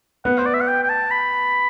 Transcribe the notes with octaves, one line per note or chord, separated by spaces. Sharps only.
B3 F#5
C5
D5
E5
F#5
G5
G5
A5
B5